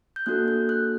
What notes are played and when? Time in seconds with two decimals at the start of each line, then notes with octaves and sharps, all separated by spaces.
0.16 G6
0.26 A#3 D4 F#4 A4 F#6
0.48 G6
0.69 F#6